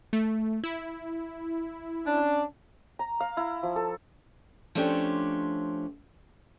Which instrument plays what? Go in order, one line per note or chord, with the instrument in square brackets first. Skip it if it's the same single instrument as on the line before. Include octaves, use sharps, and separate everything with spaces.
[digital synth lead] A3
E4
[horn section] C#4 D4
[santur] A#5
F5
E4
F3
A4
[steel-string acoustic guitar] F3 A3 C#4 D4 G4 C5